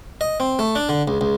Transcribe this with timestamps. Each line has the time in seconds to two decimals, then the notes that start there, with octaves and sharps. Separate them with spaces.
0.21 D#5
0.40 C4
0.59 A3
0.75 D4
0.89 D3
1.08 C#2
1.21 C#2